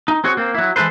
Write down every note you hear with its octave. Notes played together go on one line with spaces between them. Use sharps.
D#4
C4 F#4 G#4 C#5
A#3 C4
F#3 E4
E3 G#3 E4 A4 B4 C5